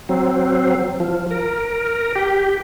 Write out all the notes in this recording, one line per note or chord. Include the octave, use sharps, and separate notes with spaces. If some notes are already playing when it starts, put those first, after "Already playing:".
F#3 C4
F3
A#4
G4